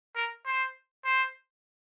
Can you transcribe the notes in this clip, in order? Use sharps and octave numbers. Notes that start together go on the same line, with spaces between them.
A#4
C5
C5